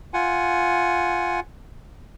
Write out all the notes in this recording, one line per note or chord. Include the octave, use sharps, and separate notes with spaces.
F4 F#5 G#5